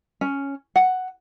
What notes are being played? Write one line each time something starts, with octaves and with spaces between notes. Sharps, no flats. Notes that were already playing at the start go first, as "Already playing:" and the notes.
C#4
F#5